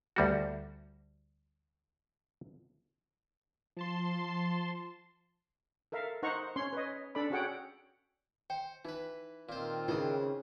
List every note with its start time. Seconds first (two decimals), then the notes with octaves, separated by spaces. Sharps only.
0.16 D2 G3 F#4
3.77 F3 A5 C6
5.92 A4 A#4 E5 F5
6.23 D#4 C5 F#5 A#5 C#6
6.56 C#4 C#5 C6
6.73 B4 C#5 D#5
7.15 D4 A4 D5 B5
7.30 C#4 F#4 G#4 C#5 F#5 G5
8.50 C5 G5
8.85 E3 D#4 B4
9.49 A#2 D#3 C4 F4 C5
9.88 C#3 E3 D#4 E4 C5 D#6